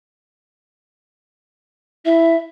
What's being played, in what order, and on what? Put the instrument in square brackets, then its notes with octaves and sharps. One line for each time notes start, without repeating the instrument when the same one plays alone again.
[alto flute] E4 [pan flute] E5